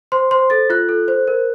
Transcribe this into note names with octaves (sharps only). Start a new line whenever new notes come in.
C5 C6
C5 C6
A4 A6
F4 F#6
A4
C5
A#4